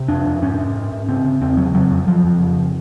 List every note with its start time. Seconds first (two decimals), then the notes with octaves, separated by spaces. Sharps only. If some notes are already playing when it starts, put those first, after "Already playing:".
Already playing: C3
0.08 F2 D4
0.26 F2
0.42 G#2 C#4
0.58 G#2
0.75 G#2
0.92 G#2
1.08 C#3 C4
1.24 C#3
1.41 E2 C4
1.57 C#3 F#3
1.74 F2 F#3
1.91 F2
2.07 F2 F3
2.24 F2
2.40 C#3